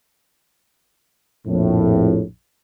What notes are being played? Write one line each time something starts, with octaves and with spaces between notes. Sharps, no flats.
A#1 F2 A2